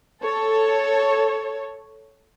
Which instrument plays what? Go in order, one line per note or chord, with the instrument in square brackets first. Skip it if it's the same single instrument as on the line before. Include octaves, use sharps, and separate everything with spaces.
[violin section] A4 C#5